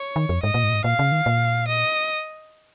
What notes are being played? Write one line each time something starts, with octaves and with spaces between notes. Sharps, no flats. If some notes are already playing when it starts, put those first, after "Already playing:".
Already playing: C#5
D#3
F2
G#2 D#5
A#2
G#2
A#2
G#2
A#2 F5
C#3
D#3
A#2
D#5